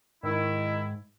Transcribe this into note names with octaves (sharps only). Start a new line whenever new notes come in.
G#2 D#3 E4